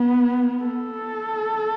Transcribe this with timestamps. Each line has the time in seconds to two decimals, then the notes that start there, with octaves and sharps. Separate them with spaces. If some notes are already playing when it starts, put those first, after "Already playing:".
Already playing: B3
0.65 A4